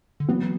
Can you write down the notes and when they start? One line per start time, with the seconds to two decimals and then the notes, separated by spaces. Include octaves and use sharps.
0.20 D3
0.29 E3 F#3 B3